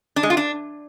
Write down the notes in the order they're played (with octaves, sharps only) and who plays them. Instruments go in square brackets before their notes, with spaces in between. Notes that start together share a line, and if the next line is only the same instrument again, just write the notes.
[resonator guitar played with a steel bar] D4
G#3
F4
D4